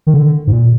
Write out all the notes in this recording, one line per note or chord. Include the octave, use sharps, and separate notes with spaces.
D#3
D3
G#2
A#2